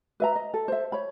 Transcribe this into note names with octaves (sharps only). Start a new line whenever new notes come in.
B4 E5 A#5
D#5
A4
C5 E5
C#5 B5